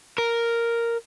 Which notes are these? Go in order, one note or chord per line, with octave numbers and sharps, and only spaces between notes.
A#4